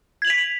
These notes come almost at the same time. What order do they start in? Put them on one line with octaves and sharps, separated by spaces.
G#6 F#7 F7 B6